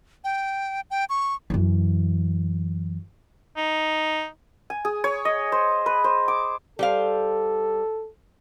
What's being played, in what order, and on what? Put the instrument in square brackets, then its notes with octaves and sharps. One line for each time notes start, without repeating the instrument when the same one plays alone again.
[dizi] G5
G5
C#6
[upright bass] F#2 E3
[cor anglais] D#4
[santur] G#5
G#4
C#5
D#5
C5
B4
C5
D6
[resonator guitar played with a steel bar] G3 C5 F5 [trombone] A4